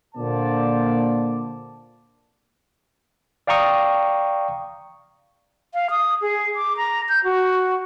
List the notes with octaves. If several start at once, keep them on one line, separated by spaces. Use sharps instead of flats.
A#2 D3 A#3 C5 D5 A5
D5 F5 G5 A#5 C#6 D#6
F5
D#6
G#4
D6
A#5
G6
F#4